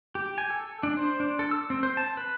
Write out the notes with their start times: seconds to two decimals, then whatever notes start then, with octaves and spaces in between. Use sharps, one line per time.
0.15 G4
0.38 G#5
0.50 A4
0.83 D4
0.97 C5
1.20 D4
1.39 A4
1.51 E6
1.70 C4
1.83 C5
1.97 A5
2.17 B4